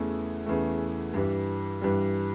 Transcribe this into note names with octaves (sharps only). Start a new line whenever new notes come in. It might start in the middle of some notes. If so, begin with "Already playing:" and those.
Already playing: E2 C#3 E3 A3
E2 C#3 E3 A3
G2 E3 G3
G2 E3 G3